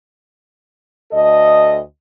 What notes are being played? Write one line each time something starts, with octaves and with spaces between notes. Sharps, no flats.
D2 A4 D#5